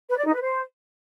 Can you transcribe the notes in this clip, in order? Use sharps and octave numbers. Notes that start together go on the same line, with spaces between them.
B4
D5
D#4
B4
C5